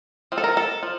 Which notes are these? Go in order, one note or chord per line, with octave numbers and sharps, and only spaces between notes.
F3 C4
A4
A#4
A4
F3